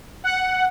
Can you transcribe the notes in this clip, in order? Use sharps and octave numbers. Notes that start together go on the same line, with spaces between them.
F#5